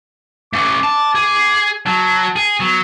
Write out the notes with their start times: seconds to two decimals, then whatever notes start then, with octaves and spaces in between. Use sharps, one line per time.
0.53 A3 C#4 D6
0.83 A5
1.15 G#4
1.86 F#3 A5
2.36 G#4
2.60 F#3 B3